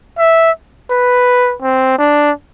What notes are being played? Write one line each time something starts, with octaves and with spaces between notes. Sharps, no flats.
E5
B4
C4
D4